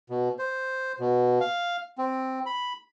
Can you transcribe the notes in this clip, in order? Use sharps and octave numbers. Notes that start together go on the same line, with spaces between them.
B2
C5
B2
F5
C4
B5